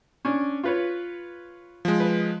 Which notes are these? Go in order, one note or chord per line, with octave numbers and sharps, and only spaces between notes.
C#4 D4
F4 B4 C#5
F3 G#3
B4